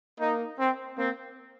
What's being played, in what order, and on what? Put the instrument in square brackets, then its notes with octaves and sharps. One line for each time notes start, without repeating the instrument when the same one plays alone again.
[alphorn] A#3 [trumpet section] D#4
[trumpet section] C4
[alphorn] A#3 [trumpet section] C4